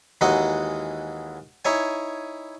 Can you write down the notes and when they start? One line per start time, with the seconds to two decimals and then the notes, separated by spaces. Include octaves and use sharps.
0.21 D#2 E3 G#3 D#4 F#4 D#5
1.65 D#4 E4 C#5 G#5